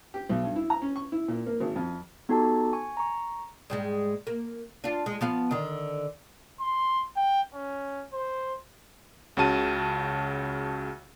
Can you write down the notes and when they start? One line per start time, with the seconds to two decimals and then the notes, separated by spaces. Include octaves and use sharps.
0.14 G4
0.29 B1
0.44 G2
0.56 E4
0.70 A#5
0.82 C#4
0.96 C#6
1.12 E4
1.28 A#2
1.46 A#3
1.60 G#1
1.76 F2
2.29 B3 D#4 F#4 G4 A4 A5
2.73 G#5 C#6
2.97 A#5 C#6
3.70 G#2 G3 G#3
4.27 A#3
4.84 D4 F4
5.06 G#3
5.21 F3 B3 F5
5.51 D3 D#3
6.60 C6
7.16 G5
7.54 C#4
8.13 C5
9.37 C#2 C#3 F#4 A5 D#7